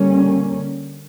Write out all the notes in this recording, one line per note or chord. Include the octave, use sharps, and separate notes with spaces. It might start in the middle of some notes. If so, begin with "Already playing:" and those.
Already playing: D3 G3 A#3 C#4